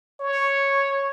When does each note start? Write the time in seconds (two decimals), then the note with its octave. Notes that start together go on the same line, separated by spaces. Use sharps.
0.21 C#5